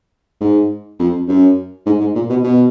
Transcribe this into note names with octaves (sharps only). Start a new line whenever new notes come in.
G#2
F2
F#2
G#2
G#2
A#2
B2
B2